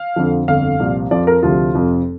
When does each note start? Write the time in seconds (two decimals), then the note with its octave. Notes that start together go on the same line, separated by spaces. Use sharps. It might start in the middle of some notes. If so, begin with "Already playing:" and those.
Already playing: F5
0.16 F2 D3 F3
0.48 G1 F2 D3 F5
0.80 C2 A#2 F3
1.11 F2 F3 D5
1.27 A#4
1.43 D2 C3 F3 F4
1.75 F1 F2 F3